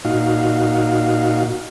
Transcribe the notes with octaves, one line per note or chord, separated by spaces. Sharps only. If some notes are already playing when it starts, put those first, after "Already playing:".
A#2 D#4 F#4 F5